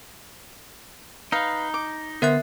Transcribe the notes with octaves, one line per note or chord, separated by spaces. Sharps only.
D#4 B4 F5
D6
D3 B3 A#4 C5 E5 F#6